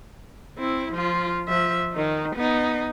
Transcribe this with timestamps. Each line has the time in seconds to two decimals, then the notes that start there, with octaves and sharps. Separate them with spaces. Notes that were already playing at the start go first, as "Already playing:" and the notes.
0.58 C4 E4
0.93 F3 F4
1.48 F3 E5
1.93 D#3 D#4
2.36 B3 D#4